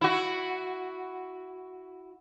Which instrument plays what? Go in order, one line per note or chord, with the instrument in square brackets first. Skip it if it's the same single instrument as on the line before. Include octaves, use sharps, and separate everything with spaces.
[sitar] E4 F#4